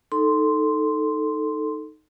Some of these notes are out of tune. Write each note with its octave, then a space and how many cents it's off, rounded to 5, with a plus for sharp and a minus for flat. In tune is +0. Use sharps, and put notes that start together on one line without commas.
D#4 +0 A4 +0 C6 -5